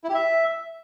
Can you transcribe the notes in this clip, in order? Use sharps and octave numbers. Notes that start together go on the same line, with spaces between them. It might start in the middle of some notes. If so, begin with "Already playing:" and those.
E4
G4
E5